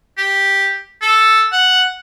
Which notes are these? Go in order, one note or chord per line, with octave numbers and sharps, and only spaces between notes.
G4
A4
F#5